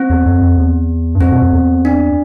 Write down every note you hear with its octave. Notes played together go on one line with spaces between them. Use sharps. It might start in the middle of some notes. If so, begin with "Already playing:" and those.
Already playing: C4
E2
F2
F2
E2
G2
F2 C4
B2
F2
E2
D4